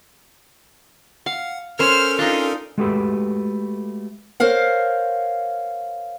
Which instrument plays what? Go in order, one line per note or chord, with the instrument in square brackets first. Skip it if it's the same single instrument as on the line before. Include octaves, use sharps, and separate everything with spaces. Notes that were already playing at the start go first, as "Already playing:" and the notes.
[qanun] F5 [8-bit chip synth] F#5
[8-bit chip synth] C#4 A4 A#4 [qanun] C5 C#5 [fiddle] F6
[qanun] D4 D#4 [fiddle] F4
[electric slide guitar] G#3 A3 F#4 G4 A4 B4
[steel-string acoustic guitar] A#4 C5 C#5 F5 F#5